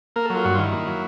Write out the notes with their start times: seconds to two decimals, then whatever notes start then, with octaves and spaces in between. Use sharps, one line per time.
0.16 A#3 A#4
0.25 F#3 A4
0.35 F4
0.45 G2 F#4
0.54 D#3 F4
0.63 E4
0.72 A#3
0.87 F#3